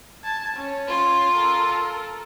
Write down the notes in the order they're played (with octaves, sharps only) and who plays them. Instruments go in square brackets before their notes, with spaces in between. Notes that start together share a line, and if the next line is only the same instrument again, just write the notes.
[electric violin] A5 G#6
C#4 C#5
[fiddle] F4
[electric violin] A4 A#4